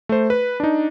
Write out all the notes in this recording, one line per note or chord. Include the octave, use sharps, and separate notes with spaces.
A3 C5
B4
D4 D#4